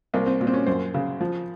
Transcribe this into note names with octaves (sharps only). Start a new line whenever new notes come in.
C2 A#3
C4
A#2
C4
C#4
F#2 C5
C#3
F3